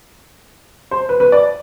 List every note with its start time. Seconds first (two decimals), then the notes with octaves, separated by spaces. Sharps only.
0.91 C5
1.09 B4
1.20 B4
1.32 D5